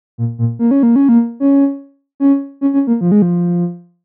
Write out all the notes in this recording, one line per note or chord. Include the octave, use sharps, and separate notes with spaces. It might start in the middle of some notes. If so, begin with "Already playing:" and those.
A#2
A#2
A#3
C#4
A#3
C#4
A#3
C#4
C#4
C#4
C#4
A#3
F3
G#3
F3